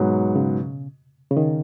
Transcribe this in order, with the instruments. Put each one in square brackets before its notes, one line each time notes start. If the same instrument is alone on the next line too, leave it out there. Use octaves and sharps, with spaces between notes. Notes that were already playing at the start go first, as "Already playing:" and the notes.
Already playing: [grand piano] G#2 F#3 B3 F#4 [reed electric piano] B2
[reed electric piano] C#3
C#3
D#3